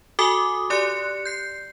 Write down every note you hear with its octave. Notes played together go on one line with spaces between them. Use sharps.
F#4 A4 G#5 D6 D#6
G4 D5 C6 F#6 C#7
G6 C7